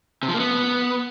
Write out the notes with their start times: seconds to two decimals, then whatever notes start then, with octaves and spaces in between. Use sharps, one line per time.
0.23 C3
0.28 F3
0.34 A#3
0.40 B3